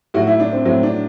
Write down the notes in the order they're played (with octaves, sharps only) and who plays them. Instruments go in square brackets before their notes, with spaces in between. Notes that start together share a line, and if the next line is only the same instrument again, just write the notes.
[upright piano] A2 F#3 F#4
E4
D4
C4
A2 F#3 C4
D4